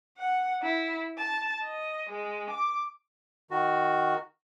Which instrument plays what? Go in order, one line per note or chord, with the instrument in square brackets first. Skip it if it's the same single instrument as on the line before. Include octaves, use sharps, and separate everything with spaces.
[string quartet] F#5
E4
A5
D#5
G#3
D6
[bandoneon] D#3 F#4